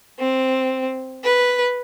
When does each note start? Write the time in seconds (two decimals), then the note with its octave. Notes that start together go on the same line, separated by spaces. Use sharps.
0.19 C4
1.24 B4